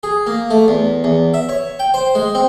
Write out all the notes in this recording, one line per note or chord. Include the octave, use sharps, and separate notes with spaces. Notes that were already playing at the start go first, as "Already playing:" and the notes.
G#4
A#3
A3
E2
E2
E5
C#5
G5
C5
G#3
C4